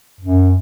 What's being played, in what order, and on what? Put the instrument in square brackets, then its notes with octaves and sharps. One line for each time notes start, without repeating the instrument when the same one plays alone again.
[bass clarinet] F#2